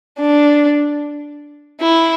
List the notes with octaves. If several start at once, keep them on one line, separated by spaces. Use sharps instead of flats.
D4
E4